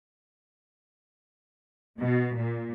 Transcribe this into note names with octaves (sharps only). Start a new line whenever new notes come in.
B2
A#2